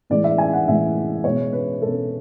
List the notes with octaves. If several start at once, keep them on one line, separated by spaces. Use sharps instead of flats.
A2 E3 G#3 D5
E5
G#5
F#5
A2 E3 G#3 E5
B2 G#3 C#5
B4
B2 G#3 A4